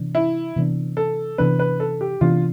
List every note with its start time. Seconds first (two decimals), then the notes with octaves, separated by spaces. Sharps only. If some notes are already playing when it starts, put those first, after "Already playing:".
Already playing: C3 E3 B3 D4
0.15 E4
0.56 C3 E3 B3 D4
0.97 A4
1.38 C3 E3 B3 D4 B4
1.59 B4
1.80 A4
2.01 G4
2.21 C3 E3 B3 D4 F4